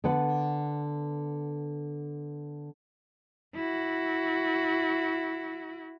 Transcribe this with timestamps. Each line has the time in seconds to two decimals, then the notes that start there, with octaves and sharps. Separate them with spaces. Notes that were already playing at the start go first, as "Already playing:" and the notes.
0.04 D3 B3 B4 F#5
3.55 E4 F#4